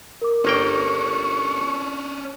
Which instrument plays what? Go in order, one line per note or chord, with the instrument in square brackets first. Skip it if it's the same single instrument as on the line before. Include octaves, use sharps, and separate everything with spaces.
[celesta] A#4 D6
[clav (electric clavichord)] G1 A#3 G5 [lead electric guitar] C#4 D4 [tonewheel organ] C#6